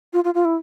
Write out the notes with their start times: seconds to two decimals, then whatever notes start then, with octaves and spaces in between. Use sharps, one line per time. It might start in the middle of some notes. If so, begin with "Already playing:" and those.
0.13 F4
0.24 F4
0.34 F4
0.45 E4